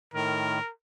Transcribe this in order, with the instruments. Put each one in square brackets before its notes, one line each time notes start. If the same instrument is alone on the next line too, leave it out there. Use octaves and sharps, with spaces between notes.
[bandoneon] A2 D#3 [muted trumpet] A#4